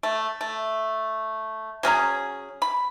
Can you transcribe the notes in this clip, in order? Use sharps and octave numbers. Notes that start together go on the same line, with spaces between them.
A3
A3
F#3 C#4 G#4 A#5
B5